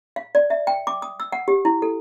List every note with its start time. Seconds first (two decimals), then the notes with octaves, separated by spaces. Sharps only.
0.16 F5
0.35 D5
0.50 E5
0.67 G5
0.87 D6
1.02 D#6
1.20 E6
1.32 F#5
1.48 G4
1.65 E4
1.82 A4